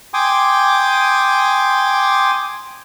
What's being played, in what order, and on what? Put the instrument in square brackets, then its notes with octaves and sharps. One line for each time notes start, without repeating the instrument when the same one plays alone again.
[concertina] G5 G#5 C6 D6 D#6